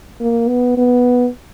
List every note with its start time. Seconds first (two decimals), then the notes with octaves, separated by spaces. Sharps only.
0.20 A#3
0.48 B3
0.77 B3